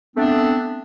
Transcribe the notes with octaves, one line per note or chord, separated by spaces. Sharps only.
A3 B3 C4 D4